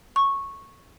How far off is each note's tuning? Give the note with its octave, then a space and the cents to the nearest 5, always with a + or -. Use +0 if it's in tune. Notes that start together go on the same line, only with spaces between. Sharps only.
C#6 -10